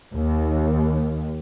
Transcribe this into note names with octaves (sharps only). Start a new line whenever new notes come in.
D#2